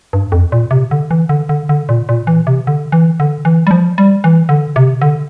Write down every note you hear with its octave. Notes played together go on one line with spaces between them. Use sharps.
G2
F2
A#2
C3
D3
E3
D3
D3
D3
A#2
A#2
E3
C3
D3
E3
D3
E3
G3
F3
G3
E3
D3
C3
D3